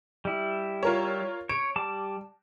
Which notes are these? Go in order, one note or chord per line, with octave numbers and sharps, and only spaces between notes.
G3 E4
F4 A#4 C#5
C#5 D7
G3 A5 D6